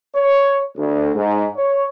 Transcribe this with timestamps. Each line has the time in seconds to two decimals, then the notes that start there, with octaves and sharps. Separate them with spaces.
0.15 C#5
0.76 D2
1.14 G#2
1.56 C#5